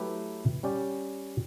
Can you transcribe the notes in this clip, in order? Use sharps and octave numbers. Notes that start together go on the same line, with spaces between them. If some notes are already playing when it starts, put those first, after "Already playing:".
Already playing: F#3 A3 E4 G4 B4
G3 C#4 G4 D5